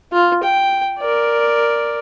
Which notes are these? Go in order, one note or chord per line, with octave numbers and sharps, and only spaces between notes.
F4
G5
A#4 D5